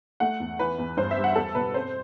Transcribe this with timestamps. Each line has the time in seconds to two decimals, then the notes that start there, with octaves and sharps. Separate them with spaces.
0.20 A3 F#5
0.40 E2
0.59 E3 B4
0.78 E2
0.97 G2 C5
1.11 E5
1.17 G3
1.24 F#5
1.35 E2 A4
1.55 B2 B4
1.74 C4 C5